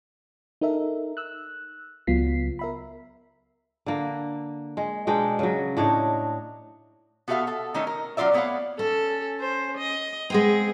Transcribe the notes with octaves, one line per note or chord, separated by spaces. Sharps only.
D#4 A4 A#4 E5
E6 F#6
C#2 F#3 B3 F4 B6 C7
A#4 E5 B5
D3 A#3
G#3
B2 G#3 D4 G5
C#3 F#3
A2 D4 D#4 C#5
B3 F#4 G4 A4 E5 F5
A4
D#3 A3 C#4 D#4 C#5
A#4
F#3 C#4 F4 D5 E5
A3 B3 B4 C#5 F5
C#4 A4
C5
D#5
G#3 B3 C4 G#4